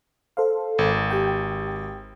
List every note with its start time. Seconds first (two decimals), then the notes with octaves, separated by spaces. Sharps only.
0.37 A4 C5 F5
0.79 G#1
1.11 G4 G5